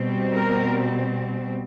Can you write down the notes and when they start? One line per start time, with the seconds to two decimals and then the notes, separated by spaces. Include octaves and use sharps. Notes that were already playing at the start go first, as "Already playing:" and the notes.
Already playing: B2 G3 C4
0.35 A#4